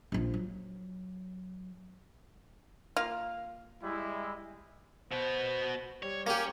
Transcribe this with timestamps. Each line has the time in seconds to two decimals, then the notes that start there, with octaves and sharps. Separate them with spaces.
0.12 A#1 F3
0.34 F#3
2.97 A#3 F4 F5
3.82 G3 G#3 E4
5.12 B2 B3 C5
6.03 G3 C#5
6.27 A#3 C#4 G4